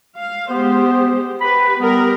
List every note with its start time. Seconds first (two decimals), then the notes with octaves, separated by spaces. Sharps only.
0.18 F5
0.50 G#3 B3 G4 C5
1.41 G4 B4 B5
1.79 G3 B3 A#4